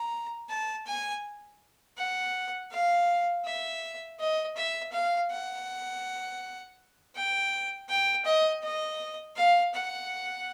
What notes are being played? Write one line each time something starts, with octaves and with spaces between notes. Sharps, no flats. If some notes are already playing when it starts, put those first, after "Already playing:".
Already playing: A#5
A5
G#5
F#5
F5
E5
D#5
E5
F5
F#5
G5
G5
D#5
D#5
F5
F#5